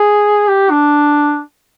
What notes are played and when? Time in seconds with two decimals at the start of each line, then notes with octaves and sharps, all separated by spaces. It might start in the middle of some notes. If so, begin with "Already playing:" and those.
Already playing: G#4
0.48 G4
0.71 D4